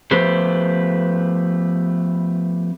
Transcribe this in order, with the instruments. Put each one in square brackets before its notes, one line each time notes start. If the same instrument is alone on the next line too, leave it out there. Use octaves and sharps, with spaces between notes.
[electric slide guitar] F3 A3 B3 G4 B4 C5